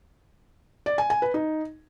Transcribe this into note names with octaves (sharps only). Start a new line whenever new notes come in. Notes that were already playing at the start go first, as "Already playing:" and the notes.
D5
G#5
G#5
B4
D#4